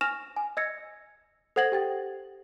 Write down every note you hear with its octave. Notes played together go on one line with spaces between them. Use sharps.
G#5 C#6 F6 A#6 E7 F7
G#5
D#5 E6 G#6 A#6 C#7
A4 C5 F#5 G#6 A#6 F#7
G4 G5 A6